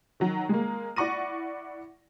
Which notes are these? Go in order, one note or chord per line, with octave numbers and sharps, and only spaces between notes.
D#3 F#3
G#3 A#3
E4 D5 F#5 C#6 A#6 D#7